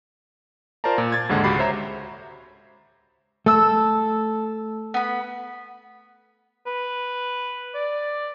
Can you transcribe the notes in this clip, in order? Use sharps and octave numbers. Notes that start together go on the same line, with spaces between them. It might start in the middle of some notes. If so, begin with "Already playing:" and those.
F4 A#4 C5 D5 A5 A#5
A#2
G#6 A6
D#2 G#2 D3 G#3 F#5
C#2 F#4 G4 B5 C7
C5 C#5 E5 A#5
A3 A4 E6
B3 B5
B4
D5